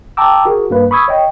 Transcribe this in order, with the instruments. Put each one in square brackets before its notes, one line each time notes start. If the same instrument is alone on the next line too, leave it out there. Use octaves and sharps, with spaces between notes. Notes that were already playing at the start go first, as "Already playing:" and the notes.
[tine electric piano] G5 A5 A#5 D6 E6
F#4 G#4 A#4
G2 A#3 B4
B5 C#6 D#6 E6 G#6
C#5 D#5 G5